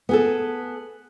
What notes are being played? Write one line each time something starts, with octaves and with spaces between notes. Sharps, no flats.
B3 G#4 A4